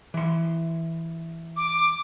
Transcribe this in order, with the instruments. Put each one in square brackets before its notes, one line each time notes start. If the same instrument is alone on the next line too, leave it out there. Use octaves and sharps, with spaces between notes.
[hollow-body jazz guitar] E3 C6
[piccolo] D6